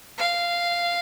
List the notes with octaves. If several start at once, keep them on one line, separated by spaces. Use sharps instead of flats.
F5